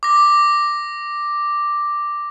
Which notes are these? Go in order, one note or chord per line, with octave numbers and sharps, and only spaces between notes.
D6 A#6